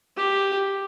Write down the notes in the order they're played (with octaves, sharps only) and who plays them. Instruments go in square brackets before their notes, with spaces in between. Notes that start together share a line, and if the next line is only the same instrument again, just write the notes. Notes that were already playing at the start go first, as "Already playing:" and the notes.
[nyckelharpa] G4